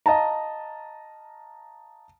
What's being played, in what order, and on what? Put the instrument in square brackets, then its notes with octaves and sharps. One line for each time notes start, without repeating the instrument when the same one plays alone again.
[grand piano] D#5 F5 A5 A#5